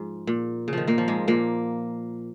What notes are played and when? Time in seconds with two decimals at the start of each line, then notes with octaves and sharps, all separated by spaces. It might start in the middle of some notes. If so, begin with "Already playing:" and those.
Already playing: G#2 F3
0.27 A#2
0.68 C#3
0.73 D#3 F3
0.87 A#2 A#3
0.98 F3
1.08 G#2 G#3
1.28 A#2 A#3